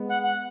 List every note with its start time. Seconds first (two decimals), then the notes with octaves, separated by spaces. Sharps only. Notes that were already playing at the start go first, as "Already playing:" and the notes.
Already playing: G#3 B3
0.09 F#5
0.23 F#5